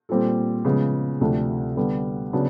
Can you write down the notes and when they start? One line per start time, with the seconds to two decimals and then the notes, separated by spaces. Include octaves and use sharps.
0.09 A#2 G3 C4 F4 A4
0.65 C#3 F3 G#3 B3
1.21 D2 C3 F3 A3 D4
1.76 D3 G3 B3
2.33 C#3 F#3 B3 D4